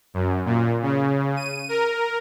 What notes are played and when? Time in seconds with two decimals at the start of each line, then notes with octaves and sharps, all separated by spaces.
0.14 F#2
0.45 A#2
0.82 C#3
1.36 D#7
1.69 A#4